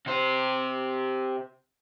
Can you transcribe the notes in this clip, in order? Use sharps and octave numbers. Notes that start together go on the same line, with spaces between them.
C3 C5